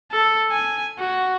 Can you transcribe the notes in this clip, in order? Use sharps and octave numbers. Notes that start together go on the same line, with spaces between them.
A4
G#5
F#4